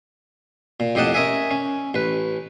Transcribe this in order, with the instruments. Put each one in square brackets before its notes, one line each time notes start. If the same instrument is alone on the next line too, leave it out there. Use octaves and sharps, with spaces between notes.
[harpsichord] A#2
F2 A2 G4 D#5 F#5 A5
C#4 A#4 D#5 E5 G#5
C#4
A1 B4